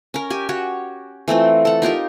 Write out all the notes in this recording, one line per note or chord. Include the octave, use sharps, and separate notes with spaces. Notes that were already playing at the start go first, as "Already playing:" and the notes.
C#4 A#4
G4 G#5
F#4 G4 C#5
E3 A3 C4 F4
A4 F#5
D#4 F4 G4 A#4